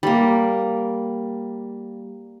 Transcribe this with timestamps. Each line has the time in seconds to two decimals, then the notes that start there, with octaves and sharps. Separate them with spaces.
0.03 G3 A#3